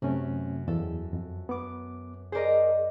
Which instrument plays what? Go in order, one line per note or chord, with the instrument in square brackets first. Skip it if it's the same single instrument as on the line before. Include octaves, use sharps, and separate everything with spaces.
[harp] F#2 [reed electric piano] C3 A3 C#4
[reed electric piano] E2 [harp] A4
[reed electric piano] F2
B3 D6
[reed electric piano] G#4 A#4 [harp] C5 D5 D#5